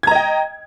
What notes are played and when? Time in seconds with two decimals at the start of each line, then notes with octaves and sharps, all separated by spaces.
0.03 G#6
0.07 A#5
0.11 D#5
0.15 G5